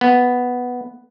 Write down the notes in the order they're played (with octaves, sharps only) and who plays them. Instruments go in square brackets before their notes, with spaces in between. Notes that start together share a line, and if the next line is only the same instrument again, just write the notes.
[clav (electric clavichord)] B3